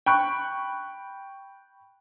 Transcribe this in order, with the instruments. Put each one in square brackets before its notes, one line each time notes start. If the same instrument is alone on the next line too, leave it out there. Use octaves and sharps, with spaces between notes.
[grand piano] G5 B5 C#6 F#6